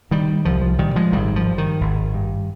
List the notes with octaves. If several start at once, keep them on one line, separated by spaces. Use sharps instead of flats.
A#2 D#3 G3
C2 F3
F3
A#2 D#3 G3
F3 G#3
G#1 D#3 G3
F3
G2
D#3
G#1
G2